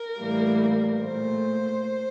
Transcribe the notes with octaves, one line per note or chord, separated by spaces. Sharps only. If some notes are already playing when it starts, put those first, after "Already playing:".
Already playing: A#4
A2 E3 G3 A#3
A#2 A3 C5